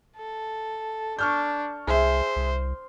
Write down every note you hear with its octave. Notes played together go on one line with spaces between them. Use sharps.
A4
D4 C#6 F6 G6
C2 G#4 C5 E5
C2